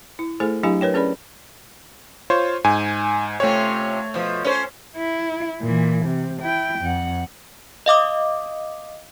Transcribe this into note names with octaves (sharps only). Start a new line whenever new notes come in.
E4
A3 E4 G#4 A4 C5 G#5
F#3 D4 E4 G4 F5 G#5
A#4 B4 C#5 G5
C#4 G#4 B4 D5 B5
F4 C5 C#5
G#2 G#5
C3 A3 C#4 F4 C#5
B2 F3
C#4 B4 C5
E4
A#2 E3
C3
E4 G5
F2 F#5
D#5 F5 D6 D#6